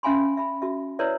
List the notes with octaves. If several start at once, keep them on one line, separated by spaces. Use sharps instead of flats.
C#4 E5 F5 G#5 B5 C6
E5 B5
F#4 E5
E4 A#4 B4 C#5 D5 E5